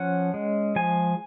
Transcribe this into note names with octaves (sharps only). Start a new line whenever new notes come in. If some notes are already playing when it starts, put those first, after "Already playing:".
Already playing: F3 C#4 F#5
G#3
F3 G#5